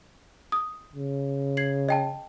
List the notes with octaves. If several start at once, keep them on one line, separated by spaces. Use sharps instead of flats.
D#6
C#3
G#6 C7 F#7
D#5 G5 A5